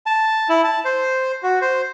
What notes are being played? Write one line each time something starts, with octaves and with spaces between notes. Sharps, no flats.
A5
E4
A5
C5
F#4
C5